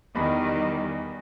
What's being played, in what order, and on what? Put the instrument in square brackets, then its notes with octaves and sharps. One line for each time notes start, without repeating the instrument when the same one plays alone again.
[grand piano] E2 B5 [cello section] D#3 G3